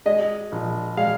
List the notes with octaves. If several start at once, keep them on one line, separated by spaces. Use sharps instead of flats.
G#3 D#5
A#1
G#3 F5